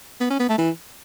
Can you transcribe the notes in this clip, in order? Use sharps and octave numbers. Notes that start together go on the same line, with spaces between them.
B3
C#4
B3
A3
E3